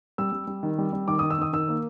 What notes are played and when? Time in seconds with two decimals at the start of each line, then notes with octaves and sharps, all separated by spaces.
0.18 G3 E6
0.32 G3
0.47 G3
0.63 D#3
0.78 G3
0.93 G3
1.08 D#3 D6
1.19 D#3 D#6
1.30 E6
1.38 D#3 D#6
1.53 D#3 E6
1.68 A#3